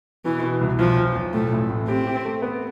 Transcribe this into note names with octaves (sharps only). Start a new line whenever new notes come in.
B2 E3
B2
C2
B1 F3
B1
B1
A2 A3
A1
A2
C4 G4
G4
A3
B3